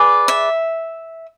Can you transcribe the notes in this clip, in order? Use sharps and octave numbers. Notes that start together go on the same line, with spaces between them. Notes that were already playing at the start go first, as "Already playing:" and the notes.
Already playing: G#4 B4 D5
E5